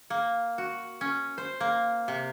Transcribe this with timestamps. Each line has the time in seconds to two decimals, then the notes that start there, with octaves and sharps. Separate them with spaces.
0.10 A#3
0.58 F#4
1.01 C#4
1.38 C5
1.60 A#3
2.08 C3